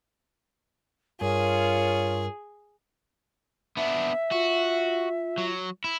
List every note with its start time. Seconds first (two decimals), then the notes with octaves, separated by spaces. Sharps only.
1.21 G2 F4 G#4 A#4 C#5
3.77 B3 D4 E5
4.32 F4 F#4
5.38 F#3
5.84 E4